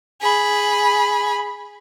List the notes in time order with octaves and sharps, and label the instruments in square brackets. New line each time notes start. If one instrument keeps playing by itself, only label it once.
[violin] G#4 B5